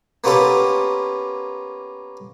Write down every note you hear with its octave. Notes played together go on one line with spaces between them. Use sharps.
A#3 B3 C#4 F4 G4 A4